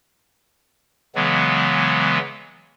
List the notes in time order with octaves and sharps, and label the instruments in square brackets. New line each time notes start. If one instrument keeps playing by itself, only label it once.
[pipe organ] C#3 E3 F#3 G#3 B3